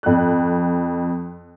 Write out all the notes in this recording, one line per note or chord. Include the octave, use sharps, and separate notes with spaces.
F2 F#6